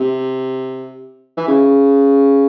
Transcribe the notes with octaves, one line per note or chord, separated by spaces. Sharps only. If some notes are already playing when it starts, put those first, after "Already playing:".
Already playing: C3
E3
C#3